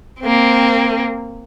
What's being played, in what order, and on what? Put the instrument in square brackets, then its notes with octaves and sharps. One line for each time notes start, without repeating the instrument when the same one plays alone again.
[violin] A#3 C4